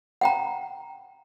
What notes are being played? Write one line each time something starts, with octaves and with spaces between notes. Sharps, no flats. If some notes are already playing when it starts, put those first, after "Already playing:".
F#5 G5 A#5